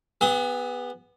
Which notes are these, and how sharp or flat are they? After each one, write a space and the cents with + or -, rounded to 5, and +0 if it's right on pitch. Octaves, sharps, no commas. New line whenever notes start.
B3 +0 G#4 -45 D#6 +45